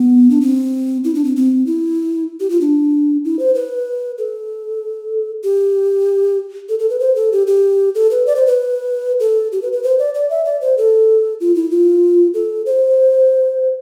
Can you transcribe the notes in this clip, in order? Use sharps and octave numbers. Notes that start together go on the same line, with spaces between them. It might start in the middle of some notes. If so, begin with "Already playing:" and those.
Already playing: B3
D4
C4
E4
D4
C4
C4
E4
G4
F4
D4
E4
C5
B4
A4
G4
A4
A4
B4
C5
A4
G4
G4
A4
B4
D5
C5
B4
A4
G4
B4
B4
C5
D5
D5
E5
D5
C5
A4
F4
E4
F4
A4
C5